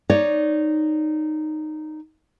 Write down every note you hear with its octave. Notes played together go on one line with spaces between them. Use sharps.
D#4 C#5 D5